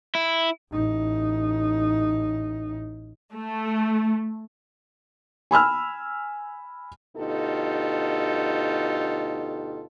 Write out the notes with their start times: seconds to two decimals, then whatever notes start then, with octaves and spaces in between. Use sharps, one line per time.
0.15 E4
0.71 A1 D#4
3.33 A3
5.51 G#5 B5 E6 F6
7.17 D2 B2 D#4 F4 G4 A4